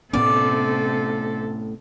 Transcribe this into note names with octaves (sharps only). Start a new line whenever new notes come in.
A2 C3 B3 C#4 A4 D5